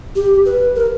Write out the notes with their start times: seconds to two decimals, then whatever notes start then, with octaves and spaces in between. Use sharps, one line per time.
0.16 G4
0.45 B4
0.75 A#4